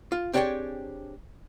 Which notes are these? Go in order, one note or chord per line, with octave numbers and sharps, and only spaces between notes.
F4
C4 D4 G4 G#4 C#5 G5